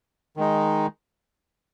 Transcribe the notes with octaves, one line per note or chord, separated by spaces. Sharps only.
D#3 G#3 D#4